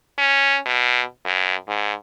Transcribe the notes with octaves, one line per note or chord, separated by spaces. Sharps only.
C#4
B2
F#2
G#2